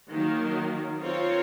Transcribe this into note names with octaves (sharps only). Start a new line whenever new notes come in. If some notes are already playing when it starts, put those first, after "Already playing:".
D#3 F#3 A#3
C4 F4 A#4 C#5